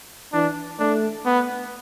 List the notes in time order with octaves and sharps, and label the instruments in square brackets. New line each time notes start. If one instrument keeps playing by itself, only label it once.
[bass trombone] E3 [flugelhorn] D4
[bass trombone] A3 [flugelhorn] D4
[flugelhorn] B3